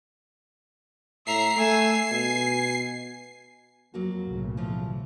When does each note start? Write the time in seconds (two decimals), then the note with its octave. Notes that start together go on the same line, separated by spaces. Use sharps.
1.27 A2 E5 A#5 C7
1.57 A3 G#5 E6
2.11 B2 G#5
3.94 F2 F#3 A#3 F#4
4.27 B1 A2 C#3
4.57 E3 F3